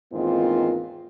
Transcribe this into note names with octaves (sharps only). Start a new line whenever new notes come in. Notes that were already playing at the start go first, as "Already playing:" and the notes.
E2 G#2 D#3 A#3 C4 F4